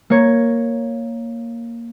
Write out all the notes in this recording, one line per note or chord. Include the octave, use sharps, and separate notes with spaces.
A#3 C#5